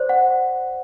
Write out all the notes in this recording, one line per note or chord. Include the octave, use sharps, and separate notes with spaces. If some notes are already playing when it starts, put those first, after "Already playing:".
Already playing: C5 D5
F#5